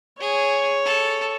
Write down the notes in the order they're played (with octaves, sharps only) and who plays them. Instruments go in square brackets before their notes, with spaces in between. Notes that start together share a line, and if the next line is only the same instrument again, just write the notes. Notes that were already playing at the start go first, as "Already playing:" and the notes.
[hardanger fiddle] G#4 [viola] C#5
[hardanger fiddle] A4